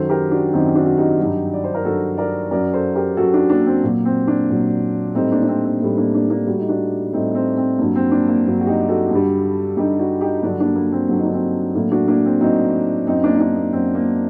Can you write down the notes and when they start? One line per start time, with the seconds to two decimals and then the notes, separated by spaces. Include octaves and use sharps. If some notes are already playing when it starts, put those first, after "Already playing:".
Already playing: F#2 D#3 F#3 A4 C5
0.09 G4 A#4
0.31 D4 F#4
0.53 F#2 D#3 F#3 C4 D#4
0.75 D4 F#4
0.86 F#4
0.97 D#4 G4
1.19 G2 F#3
1.53 D5
1.64 C5
1.74 A#4
1.85 G2 F#3 F#4 A4
2.18 A#4 D5
2.51 F#2 F#3 A#4 D5
2.74 A4 C5
2.95 G4 A#4
3.17 F#2 F#3 F#4 A4
3.34 D4 F#4
3.50 A#3 D4
3.66 C4
3.83 A#2 F#3 A#3
4.05 C4
4.27 A#3 D4
4.49 A#2 F#3
5.15 A2 G3 C4 D#4
5.31 A#3 D4
5.42 D4
5.48 C4
5.64 C4
5.81 A2 G3 C4
5.98 A#3 D4
6.14 A#3 D4
6.30 A#3 D4
6.47 A2 G3 F#4
6.59 D#4
6.68 D4 F#4
7.13 A2 G3 C4 D#4
7.35 C4
7.57 C4
7.79 G2 F#3 A#3
7.96 C4
8.11 A#3 D4
8.28 A#3
8.45 G2 F#3
8.61 F#4
8.66 D#4 G4
8.89 F#4 A4
9.11 G2 D3 G3
9.77 G2 D3 G3 D#4 G4
9.99 D4 F#4
10.21 D#4 G4
10.43 G2 D3 F#3 D4 F#4
10.60 A#3 D4
10.76 A#3
10.92 C4
11.09 G2 D3 F#3 F#4
11.17 D#4
11.25 D4
11.33 C4 D#4
11.74 A2 F#3 A#3 D4
11.92 D4 F#4
12.08 A#3 D4
12.25 C4
12.41 A2 F#3 C4 D#4
13.07 F#2 F#3 C4 D#4
13.24 A#3 D4
13.34 D#4
13.40 A#3 D4
13.56 A#3
13.73 F#2 F#3 C4
13.95 A#3